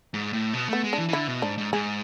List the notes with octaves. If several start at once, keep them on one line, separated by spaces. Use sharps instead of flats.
G#2
A2
B2
A3 B3
G#3
D4
E3
E3
D3 E4
B2
G#2 D4
G#2
G#2 G#4